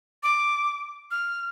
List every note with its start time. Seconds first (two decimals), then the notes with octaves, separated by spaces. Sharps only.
0.23 D6
1.11 F6